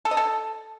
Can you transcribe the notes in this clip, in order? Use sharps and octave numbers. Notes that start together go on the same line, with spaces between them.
A4
D#5
A4